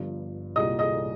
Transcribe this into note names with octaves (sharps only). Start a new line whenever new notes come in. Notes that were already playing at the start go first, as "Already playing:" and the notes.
Already playing: G1 G2 F3
C2 A#2 G3 D#5 D#6
D#5 D#6